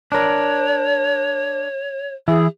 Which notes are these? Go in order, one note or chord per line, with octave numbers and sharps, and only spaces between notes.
D4 A#4 C#5
E3 E4 G#4